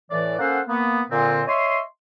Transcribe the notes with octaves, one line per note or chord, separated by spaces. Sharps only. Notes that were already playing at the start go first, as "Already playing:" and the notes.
A2 E3 D5
A#3 C#4 A4 C5 F#5
A#3 B3
A#2 D3 C4
C#5 D#5 E5 C6